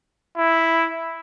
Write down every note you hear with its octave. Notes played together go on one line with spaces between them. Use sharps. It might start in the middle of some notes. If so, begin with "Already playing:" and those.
E4